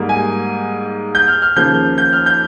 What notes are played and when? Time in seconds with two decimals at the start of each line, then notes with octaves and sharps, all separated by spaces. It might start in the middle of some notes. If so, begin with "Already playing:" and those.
Already playing: G#2 G3 A#3
0.09 G#5
1.15 G6
1.28 F6
1.42 F6
1.56 D#2 C#3 F3 A#3 G6
1.98 G6
2.13 F6
2.26 G6